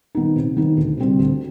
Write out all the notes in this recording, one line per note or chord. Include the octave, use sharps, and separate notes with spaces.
D#3 B3 D#4
C3
D#3 B3 D#4
D2
C3 G3 C4
D2